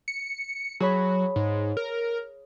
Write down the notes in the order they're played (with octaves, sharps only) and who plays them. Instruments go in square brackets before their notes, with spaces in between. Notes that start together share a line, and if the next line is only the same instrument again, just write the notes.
[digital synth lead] C#7
[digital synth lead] F#3 [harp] G#4 C#5 B5
[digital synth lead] G#2
A#4